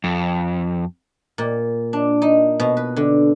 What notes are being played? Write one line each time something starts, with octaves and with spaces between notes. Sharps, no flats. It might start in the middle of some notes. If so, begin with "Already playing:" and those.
F2
A#2
D4
D#4
B2
B4
D3